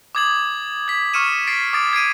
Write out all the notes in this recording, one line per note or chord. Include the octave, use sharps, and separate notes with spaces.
D6 D#6 G#6 A6 F#7
G#6 B6
C#6 D#6 F6 C#7 D#7 E7
A6 B6 C7 D7
D6 D#6 A6 D7
G#6 C7 D7 D#7